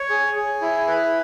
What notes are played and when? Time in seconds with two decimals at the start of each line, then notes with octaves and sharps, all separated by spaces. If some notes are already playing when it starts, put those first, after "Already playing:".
Already playing: C#5
0.10 G#4
0.36 G#4
0.62 E4
0.88 B4